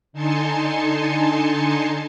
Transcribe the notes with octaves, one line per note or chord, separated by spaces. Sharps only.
D3 D#4 G#5 A5 C6 C#7